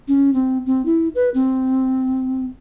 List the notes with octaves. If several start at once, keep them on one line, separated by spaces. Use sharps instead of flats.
C#4
C4
C4
E4
B4
C4